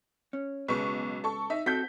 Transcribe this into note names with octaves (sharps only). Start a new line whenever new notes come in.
C#4
B1 C#3 G#3 B4 C#6
A4 C#6
D#4 E5
C4 F#4 A4 G6 B6